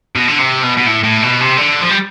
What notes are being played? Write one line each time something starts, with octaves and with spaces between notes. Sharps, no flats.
B2
D3
C3
B2
B2
A2
A2
B2
C3
D3
F3
G3